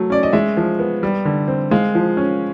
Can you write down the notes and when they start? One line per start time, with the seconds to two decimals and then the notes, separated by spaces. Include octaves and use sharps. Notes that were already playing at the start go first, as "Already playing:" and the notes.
Already playing: F#3 A3
0.10 C#4 D5
0.23 D#5
0.33 G#3 E5
0.57 F3
0.79 B3
1.03 G3
1.25 D3
1.48 C4
1.71 G#3 F5
1.95 F3
2.17 C#4